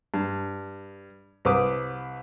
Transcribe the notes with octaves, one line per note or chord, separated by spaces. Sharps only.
G2
C2 B4 D6 D#6